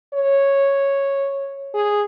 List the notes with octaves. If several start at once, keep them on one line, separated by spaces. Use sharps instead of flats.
C#5
G#4